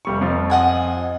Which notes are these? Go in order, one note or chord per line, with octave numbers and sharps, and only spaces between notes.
F1 G3 C#6
F2 F3
D#5 F#5 G#5